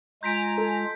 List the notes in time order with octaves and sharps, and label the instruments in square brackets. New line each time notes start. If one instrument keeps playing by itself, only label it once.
[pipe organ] G#3 F4 [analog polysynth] G#5 A#5 [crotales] G6 B6 D7
[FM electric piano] A4